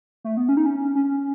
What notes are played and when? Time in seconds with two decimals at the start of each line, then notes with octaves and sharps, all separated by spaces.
0.24 A3
0.37 B3
0.49 C#4
0.57 D#4
0.66 C#4
0.95 C#4